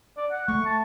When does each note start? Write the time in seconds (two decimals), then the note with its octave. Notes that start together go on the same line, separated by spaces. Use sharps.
0.17 D5
0.31 F#5
0.48 A3 C#6
0.66 A5